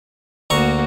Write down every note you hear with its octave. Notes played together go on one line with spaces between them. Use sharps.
D2 A#3 F#4 A#5 C#6